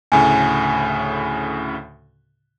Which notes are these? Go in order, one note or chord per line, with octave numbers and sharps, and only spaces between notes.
D2 A2 C#3 G#5